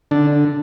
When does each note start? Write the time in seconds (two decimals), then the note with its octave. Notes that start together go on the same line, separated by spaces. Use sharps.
0.11 D3 D4